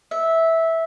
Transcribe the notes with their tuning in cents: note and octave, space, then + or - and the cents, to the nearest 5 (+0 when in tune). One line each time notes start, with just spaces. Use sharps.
E5 -10